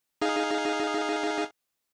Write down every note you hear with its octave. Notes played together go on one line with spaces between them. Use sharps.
D#4 G#4 F5